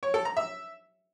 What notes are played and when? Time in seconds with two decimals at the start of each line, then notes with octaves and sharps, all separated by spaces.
0.03 C#5
0.14 A4
0.25 A#5
0.37 E5